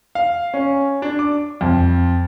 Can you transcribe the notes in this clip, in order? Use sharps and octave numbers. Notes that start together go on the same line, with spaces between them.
F5
C#4
D4
D6
F2